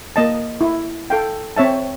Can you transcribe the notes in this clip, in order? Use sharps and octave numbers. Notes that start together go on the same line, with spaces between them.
A#3 D#5 A5
E4
A4 F5 G5
C4 C#5 E5 A5